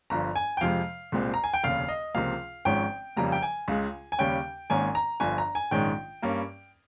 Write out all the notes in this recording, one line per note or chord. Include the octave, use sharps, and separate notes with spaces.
G1 G2 F3 A#5
G#5
G5
F2 C3 F3 G#3 F5
C2 A#2 G#3 C4
A#5
G#5
G5
F1 D#2 C#3 F5
D#5
C#2 C3 F3 A#3 F5
G#1 G#2 F3 G#3 C#4 G5
F2 C#3 G3 A#3 A#5
G5
G#5
C#2 C#3 G#3
G#5
D#2 C#3 G3 C#4 G5
G#1 G#2 D#3 A#3 C#4 G#5
A#5
G1 G2 F3 G#5
A#5
G#5
A#1 G#2 D#3 G#3 C#4 G5
G2 G3 A#3 C#4